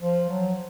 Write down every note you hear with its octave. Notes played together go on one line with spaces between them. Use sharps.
F3
F#3